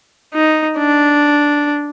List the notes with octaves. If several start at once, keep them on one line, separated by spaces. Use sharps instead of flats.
D#4
D4